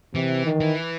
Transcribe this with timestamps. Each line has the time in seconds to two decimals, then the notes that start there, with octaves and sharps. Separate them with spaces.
0.14 C3 E3
0.46 D#3
0.60 E3